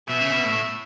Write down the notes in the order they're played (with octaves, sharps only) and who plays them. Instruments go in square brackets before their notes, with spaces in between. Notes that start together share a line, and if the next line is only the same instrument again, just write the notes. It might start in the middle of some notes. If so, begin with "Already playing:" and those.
[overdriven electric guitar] B2 [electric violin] E5
[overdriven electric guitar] C#3
B2
A2